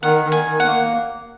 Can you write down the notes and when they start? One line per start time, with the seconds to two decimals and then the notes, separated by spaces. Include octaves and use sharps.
0.03 D#3 F#5
0.25 D#3
0.32 G#5
0.45 D#3
0.60 F#5
0.66 A#3